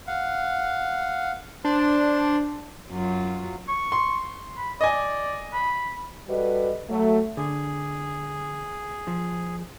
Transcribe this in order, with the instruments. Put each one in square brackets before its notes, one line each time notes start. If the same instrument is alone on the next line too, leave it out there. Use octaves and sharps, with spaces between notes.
[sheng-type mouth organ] F5 F#5
[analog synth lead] D4 [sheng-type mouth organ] C5 C6
[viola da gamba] F#2 F#3 F4
[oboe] C#6
[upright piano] C6
[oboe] B5
[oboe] D5 [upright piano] D#5 G#5
[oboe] B5
[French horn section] G3 F#4 A4 B4 D#5
F#3 A3
[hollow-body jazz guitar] D3 [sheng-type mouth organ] G#4
[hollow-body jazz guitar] F3